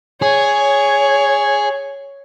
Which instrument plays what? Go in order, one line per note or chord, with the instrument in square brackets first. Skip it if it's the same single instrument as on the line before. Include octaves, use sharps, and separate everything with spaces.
[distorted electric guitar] G#4 [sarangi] C#5